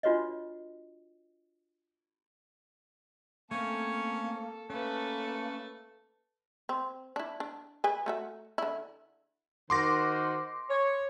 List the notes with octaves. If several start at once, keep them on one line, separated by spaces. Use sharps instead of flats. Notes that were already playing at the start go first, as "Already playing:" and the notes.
D4 F4 F#4 B4 C#5 D#5
A3 A#3 C4 C#4 A4
A3 A#3 C#4 A4 B4
C4
D4 E4
D4
G#4 B4 G#5
A3 F#4 E5
D3 E4
D#3 F#4 C5 C6 D6 A#6
C#5